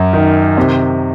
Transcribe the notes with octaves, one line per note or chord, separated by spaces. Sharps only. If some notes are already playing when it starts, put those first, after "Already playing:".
Already playing: F#2
D#3
C3